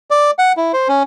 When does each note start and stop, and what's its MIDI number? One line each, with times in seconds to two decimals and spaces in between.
0.11 0.31 74
0.39 0.52 78
0.57 0.72 64
0.73 0.88 72
0.88 1.03 61